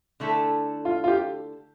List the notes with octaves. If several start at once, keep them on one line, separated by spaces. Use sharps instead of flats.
D3 A3 E4 A4
F4
F4
G4